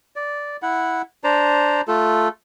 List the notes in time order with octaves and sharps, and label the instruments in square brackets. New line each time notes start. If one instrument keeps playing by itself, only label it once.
[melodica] D5
E4 F#5
D4 C5 D5 A#5
A3 F4 A4